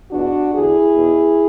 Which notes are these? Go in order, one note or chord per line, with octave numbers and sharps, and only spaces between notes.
E2 B2 D4 F#4
E2 D3 E4 G#4
E2 B2